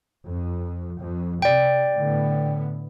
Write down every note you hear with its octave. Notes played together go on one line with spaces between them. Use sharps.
F2
F2
C3 D5 G5
A2 D3 B3